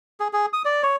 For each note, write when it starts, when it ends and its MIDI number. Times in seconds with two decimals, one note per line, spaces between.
0.20 0.28 68
0.33 0.46 68
0.53 0.62 87
0.65 0.82 74
0.83 0.96 73